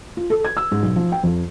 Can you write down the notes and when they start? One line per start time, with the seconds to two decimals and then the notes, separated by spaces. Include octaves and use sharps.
0.17 F4
0.30 A4
0.45 G#6
0.57 E6
0.72 G#2
0.83 B1
0.96 F3
1.12 G5
1.23 F2